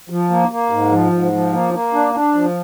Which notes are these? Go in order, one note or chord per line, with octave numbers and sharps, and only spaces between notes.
F3
A#3
A#3
G#2
F3
G#2
F3
A#3
A#3
D4
D4
F3